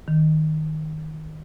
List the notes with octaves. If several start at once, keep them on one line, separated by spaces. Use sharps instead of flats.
D#3